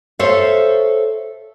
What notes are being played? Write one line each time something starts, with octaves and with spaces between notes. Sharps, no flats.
A4 C5 C#5 E5 F5